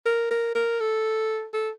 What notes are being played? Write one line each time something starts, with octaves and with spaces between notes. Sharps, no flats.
A#4
A#4
A#4
A4
A4